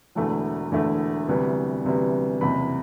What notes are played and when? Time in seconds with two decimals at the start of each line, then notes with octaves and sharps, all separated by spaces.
0.15 E1 E2 D3 A3 E4
0.71 E1 E2 D3 A3 E4
1.28 D2 C3 E3 G3 B3
1.84 D2 C3 E3 G3 B3
2.41 F#1 E2 C3 B5